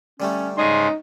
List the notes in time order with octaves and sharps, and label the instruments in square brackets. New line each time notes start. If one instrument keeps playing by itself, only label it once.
[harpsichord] D3 G3 A3 [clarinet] C#4
[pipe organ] G#2 C#3 G#4 [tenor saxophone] D#4 [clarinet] C6